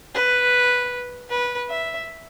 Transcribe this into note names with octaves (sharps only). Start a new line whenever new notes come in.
B4
B4
E5